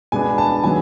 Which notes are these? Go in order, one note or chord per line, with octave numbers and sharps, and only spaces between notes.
B2 G#3 B3 D4 G#5
A5
D#3 F#3 B3 G#5